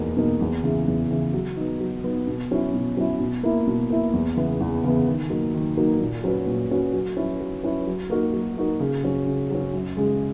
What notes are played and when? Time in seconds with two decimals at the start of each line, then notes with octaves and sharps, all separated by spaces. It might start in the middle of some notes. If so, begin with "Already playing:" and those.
Already playing: E2 B2 A#3 D#4 A#4
0.17 B2 A#3 D#4 A#4
0.41 E2
0.63 C#3 E3
0.88 E2
1.11 C#3 E3
1.34 F#3
1.57 B3 D#4
1.80 F#3
2.04 B3 D#4
2.27 B2
2.51 F#3 C#4 E4
2.74 B2
2.97 F#3 C#4 E4
3.20 B2
3.43 A#3 E4
3.67 B2
3.90 A#3 E4
4.13 E2
4.37 C#3 E3 B3
4.60 E2
4.84 C#3 E3 B3
5.07 D#3
5.30 F#3 A#3 D#4
5.54 D#3
5.77 F#3 A#3 D#4
6.00 A#2
6.24 F#3 C#4 F#4 B4
6.47 A#2
6.70 F#3 C#4 F#4 B4
6.94 F#3
7.17 C#4 E4 B4
7.40 F#3
7.63 C#4 E4 B4
7.87 F#3
8.10 A#3 D#4 F#4 A#4
8.34 F#3
8.57 A#3 D#4 F#4 A#4
8.80 C#3
9.03 F#3 C#4
9.27 C#3
9.50 F#3 C#4
9.73 F#2
9.97 C#3 G#3